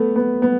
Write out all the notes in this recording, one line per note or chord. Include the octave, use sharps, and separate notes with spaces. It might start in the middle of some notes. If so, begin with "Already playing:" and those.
Already playing: A3 B3
B3
B3